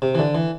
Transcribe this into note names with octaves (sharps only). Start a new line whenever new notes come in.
C3
E3
D3
E3